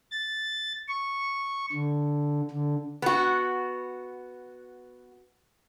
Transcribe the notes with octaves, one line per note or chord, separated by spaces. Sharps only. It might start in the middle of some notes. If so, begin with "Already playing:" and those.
A6
C#6
D3
D3
B3 F#4